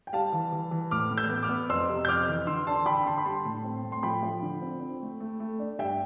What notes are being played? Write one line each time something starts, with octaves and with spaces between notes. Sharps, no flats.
G5
G3 F5 A5
E3
E3
E3
A2 D6 F6
A2
E6 G6
B3
D6 F6
B3
F2 C6 E6
C3
G6
F2 D6 F6
E3
D3 C6 E6
D4 A5 C6
D3 G5 B5
D3 A5 C6
B5
G3 A5 C6
A2
C4
A2
C6
F3 G5 B5
F3
D3
C4
C4
A3
A3
A3
D4
G2 E5 G5